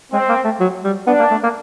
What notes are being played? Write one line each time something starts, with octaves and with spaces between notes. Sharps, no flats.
G#3 C4
A#3
A3
F#3
G3
B3 D4
A#3
A3
A#3